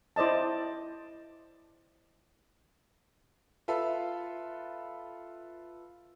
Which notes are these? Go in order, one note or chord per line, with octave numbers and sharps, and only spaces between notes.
E4 C5 D5 D#5 A5
F4 A4 B4 E5